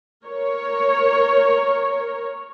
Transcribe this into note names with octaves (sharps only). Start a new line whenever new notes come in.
A#4 C#5